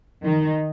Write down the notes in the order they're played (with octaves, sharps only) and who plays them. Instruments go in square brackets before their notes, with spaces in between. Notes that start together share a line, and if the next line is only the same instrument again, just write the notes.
[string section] D#3